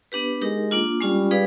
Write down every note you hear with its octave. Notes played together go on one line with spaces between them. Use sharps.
B3 D4 G4 B4
G#3 D#4 G4 A#4
A#3 D4 F4
G3 G#3 C#4 F4
D#4 G#4 B4 D5 F5